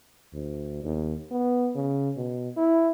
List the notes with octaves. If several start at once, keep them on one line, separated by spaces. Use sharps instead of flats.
D2
D#2
B3
C#3
B2
E4